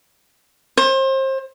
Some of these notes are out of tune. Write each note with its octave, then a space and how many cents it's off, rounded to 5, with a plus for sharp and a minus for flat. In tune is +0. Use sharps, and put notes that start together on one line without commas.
C5 +30